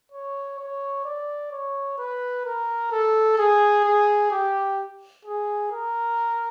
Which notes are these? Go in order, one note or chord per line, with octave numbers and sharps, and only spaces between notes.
C#5
C#5
D5
C#5
B4
A#4
A4
G#4
G#4
G4
G#4
A#4